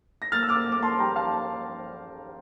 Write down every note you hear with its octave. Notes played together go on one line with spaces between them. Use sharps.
A#6
A#3 F6 A6
E6
D6 F6
A#3
D6
A#3
A5 C6
G3 G5 A#5
F5 A5